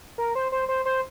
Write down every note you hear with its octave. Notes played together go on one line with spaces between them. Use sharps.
A#4
C5
C5
C5
C5